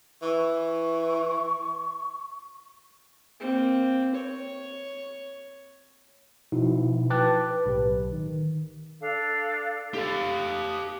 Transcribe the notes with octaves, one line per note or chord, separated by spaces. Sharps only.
E3 C#6
A#3 C4
C#5
B2 F3 D#4 E4 F#4
B4 G5 A5 D6 F#6 A6
B4
B1 A2 G4 B4
D#3
D4 A4 F5
F4 G4 A4 F5
D#6